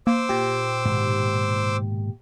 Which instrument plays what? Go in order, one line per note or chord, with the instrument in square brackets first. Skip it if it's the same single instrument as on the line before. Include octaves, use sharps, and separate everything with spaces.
[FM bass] A#3 [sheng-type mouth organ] C5 D6 E6
[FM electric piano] A#2 G4
[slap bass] G#2 B2 D#3